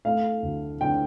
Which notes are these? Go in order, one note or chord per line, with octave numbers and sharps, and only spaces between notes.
A3 F5
D2
D3 G5